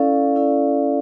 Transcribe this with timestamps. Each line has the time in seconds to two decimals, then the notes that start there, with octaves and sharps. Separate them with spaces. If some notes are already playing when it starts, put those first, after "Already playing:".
Already playing: C#4 E4 A4 D5 F5
0.36 C#4 E4 A4 D5 F5